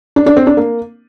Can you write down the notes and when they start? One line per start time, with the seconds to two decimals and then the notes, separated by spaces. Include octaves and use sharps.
0.16 D4
0.26 D4
0.37 C4
0.47 D4
0.57 A#3